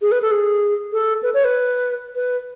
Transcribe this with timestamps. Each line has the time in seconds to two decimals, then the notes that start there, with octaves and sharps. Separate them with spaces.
0.02 G#4
0.12 B4
0.22 A4
0.31 G#4
0.93 A4
1.23 B4
1.34 C#5
1.44 B4
2.15 B4